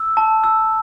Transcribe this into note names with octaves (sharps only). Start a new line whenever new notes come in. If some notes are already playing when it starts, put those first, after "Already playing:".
Already playing: E6
A5
E6